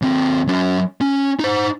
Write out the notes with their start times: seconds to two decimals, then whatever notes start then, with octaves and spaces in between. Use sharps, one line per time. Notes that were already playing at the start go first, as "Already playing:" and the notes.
0.02 D#2 C4
0.47 F#3 C#4
1.01 C#4
1.40 D#4 C5